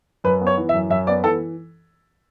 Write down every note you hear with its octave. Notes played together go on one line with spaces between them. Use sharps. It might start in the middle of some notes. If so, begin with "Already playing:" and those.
F#2 B4
B3
C#5
E3
E5
F#2
F#2 E5
B3 D5
E3 A4